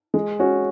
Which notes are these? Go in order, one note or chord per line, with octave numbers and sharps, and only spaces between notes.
G#3
C#4 F#4